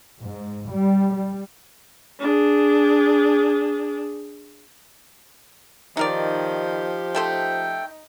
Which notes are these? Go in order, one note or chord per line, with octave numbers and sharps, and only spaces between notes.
G#2
G3
G3
D4 G#4
D#3 F3 D#4 G4 A#4 D5
A3 D#4 A4 C5 G5